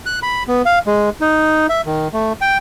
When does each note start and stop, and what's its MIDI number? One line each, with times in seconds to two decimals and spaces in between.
0.06 0.19 90
0.23 0.43 83
0.48 0.62 59
0.65 0.79 77
0.87 1.10 56
1.21 1.67 63
1.69 1.81 76
1.86 2.08 51
2.13 2.33 57
2.41 2.58 79